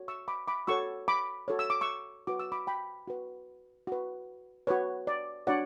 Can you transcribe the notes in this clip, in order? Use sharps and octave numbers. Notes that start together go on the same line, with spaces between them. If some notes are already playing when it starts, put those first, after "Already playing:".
Already playing: F#4 A4 C#5
C#6 E6
B5 D6
B5 D6
F#4 A4 C#5 C#6 E6
B5 D6
F#4 A4 C#5
E6
D6
C#6 E6
F#4 B4 D6
E6
B5 D6
G5 B5
F#4 B4
F#4 B4
F#4 B4 C#5
D5
D4 F#4 C#5 D5 F#5